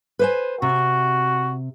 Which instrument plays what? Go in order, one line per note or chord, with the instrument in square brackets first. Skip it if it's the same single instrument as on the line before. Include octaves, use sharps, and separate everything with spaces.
[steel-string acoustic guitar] B4 C5 G#5
[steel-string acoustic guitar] C3 [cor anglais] F#4